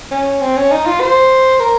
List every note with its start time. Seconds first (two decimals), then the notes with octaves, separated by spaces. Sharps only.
0.11 C#4
0.41 C4
0.56 C#4
0.72 D#4
0.86 F4
1.00 C5
1.60 A#4